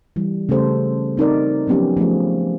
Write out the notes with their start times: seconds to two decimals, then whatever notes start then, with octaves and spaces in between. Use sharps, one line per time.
0.16 E3 G3
0.49 C#3 A3 G4 A4 C5
1.17 C4 D#4 A#4 D5
1.67 F3 F#3 B3 C#4 G4
1.97 F3 A3 G#4